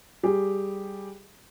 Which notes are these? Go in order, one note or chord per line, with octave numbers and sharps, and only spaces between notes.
G3 G4 G#4